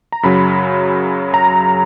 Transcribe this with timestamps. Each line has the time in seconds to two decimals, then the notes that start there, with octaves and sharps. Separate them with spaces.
0.12 A#5
0.23 F#2 C#3 F#3 B5
1.34 A#5